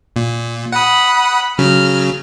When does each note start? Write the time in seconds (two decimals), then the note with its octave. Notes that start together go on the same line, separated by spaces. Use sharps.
0.16 A#2
0.73 F#5 B5 D#6
1.59 C#3 F#3 F6